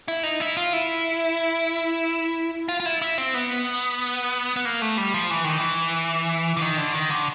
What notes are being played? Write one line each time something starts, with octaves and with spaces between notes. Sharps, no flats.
E4
D#4
E4
F4
E4
F4
F4
E4
E4
C4
B3
B3
A#3
A3
G3
F3
E3
D#3
E3
D3
D#3
D3
D#3
D3